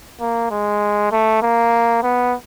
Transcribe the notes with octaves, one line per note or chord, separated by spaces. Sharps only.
A#3
G#3
A3
A#3
B3